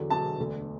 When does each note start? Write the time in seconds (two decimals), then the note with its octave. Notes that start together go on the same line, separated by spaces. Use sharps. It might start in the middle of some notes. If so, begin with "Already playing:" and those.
Already playing: E2 D3 F#3
0.10 E1 E2 D3 F#3 A5
0.38 E1 D2 D3